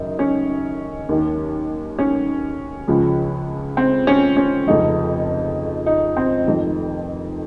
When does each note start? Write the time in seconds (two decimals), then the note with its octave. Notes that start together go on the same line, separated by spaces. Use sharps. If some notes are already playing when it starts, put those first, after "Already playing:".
Already playing: F#1 F#2 D#3 D#4
0.19 C#4
1.09 D#2 D#3
1.99 C#4
2.88 C#2 C#3 F3
3.77 C4
4.07 C#4
4.37 C#4
4.67 F1 F2 C#3 F3 D#4
5.86 D#4
6.17 C4
6.46 F1 F2 D#3